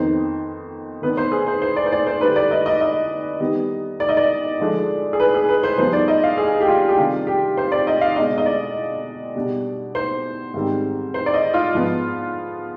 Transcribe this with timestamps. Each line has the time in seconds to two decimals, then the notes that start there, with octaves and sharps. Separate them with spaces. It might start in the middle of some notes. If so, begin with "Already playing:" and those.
Already playing: F2 D#3 B3 D#4 C5
1.02 D#3 B3 D4 B4
1.17 C5
1.32 G#4
1.47 C5
1.62 C5
1.76 D5
1.86 C5
1.92 D5
2.07 C5
2.21 D3 G3 D4 B4
2.36 D5
2.51 D#5
2.66 D#5
2.81 D#5
3.40 D#3 G3 B3
4.00 D5
4.09 D#5
4.17 D5
4.60 D3 F3 G#3 D4
5.13 G#4
5.20 B4
5.34 G#4
5.49 B4
5.63 C5
5.78 G2 F3 B3 D#4 C5
5.93 D5
6.08 D#5
6.23 F5
6.38 G#4
6.61 G4
6.68 F4
6.89 G4
6.97 C3 D#3 G3 D4 F4
7.27 G4
7.57 C5
7.72 D5
7.87 D#5
8.01 F5
8.16 B2 G#3 D4 D#5
8.38 D#5
8.46 D5
9.36 B2 G3 D4
9.95 C5
10.54 G#2 D#3 G3 C4
11.14 C5
11.26 D5
11.34 D#5
11.54 F4
11.74 G#2 F3 B3